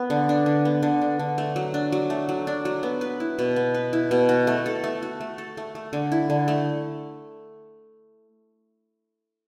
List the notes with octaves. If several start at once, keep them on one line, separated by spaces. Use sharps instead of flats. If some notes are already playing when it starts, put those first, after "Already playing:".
Already playing: B3
D3
D4
D3
B3
D3
D4
D3
A3
F#3
D4
F#3
A3
F#3
D4
F#3
B3
B4
E4
B2
B3
B4
E4
B2
F#4
A3
A4
A3
F#4
A3
A4
A3
A3
D3
E4
D3
A3